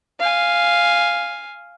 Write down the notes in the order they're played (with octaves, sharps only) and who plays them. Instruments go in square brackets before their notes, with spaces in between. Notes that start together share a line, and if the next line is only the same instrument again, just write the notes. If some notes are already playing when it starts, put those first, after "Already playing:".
[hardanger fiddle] F5 G#5